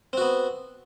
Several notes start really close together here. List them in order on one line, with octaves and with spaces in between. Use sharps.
C4 F#4 B3